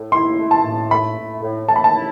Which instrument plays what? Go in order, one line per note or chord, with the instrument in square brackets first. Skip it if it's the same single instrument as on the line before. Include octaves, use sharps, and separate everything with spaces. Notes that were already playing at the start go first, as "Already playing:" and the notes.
Already playing: [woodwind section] A2
[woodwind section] E4 [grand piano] C6
[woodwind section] A3
[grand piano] A5
[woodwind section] A2
[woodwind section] A3 [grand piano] B5
[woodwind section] A2
A2
[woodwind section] A2 [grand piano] A5
[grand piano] B5
A5
[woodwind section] E4